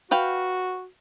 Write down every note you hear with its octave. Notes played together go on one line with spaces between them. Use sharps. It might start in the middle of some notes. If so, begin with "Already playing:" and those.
F#4 B4 F5 G5